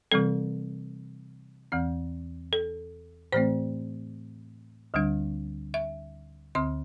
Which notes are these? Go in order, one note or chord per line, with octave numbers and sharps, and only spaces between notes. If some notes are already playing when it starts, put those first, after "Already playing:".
C3 E3 G3 C4 A4
E2 E3 C4
A4
A2 E3 A3 C4 C5
D2 D3 G3 D4
E5
D2 D3 C4 C6